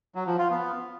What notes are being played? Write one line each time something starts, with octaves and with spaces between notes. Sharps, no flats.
F#3
F3
F4
B3